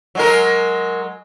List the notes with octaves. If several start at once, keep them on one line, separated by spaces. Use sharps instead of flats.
F#3 G#3 A#4